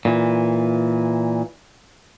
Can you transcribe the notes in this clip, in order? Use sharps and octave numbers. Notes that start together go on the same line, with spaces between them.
A#2 E3